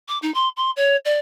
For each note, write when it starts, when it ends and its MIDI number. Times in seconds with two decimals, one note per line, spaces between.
0.08 0.18 86
0.22 0.33 63
0.34 0.48 84
0.56 0.70 84
0.76 0.96 73
1.05 1.19 74